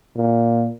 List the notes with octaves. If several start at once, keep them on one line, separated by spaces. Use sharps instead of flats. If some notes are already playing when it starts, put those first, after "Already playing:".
A#2